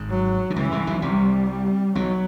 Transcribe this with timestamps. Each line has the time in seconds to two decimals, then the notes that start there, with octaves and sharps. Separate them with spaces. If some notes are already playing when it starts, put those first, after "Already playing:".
Already playing: G#1 G#2
0.10 F#3
0.50 D3
0.56 C#2 C#3 E3
0.72 C2 C3
0.87 B1 B2
1.02 C2 C3 G3
1.95 B1 B2 F#3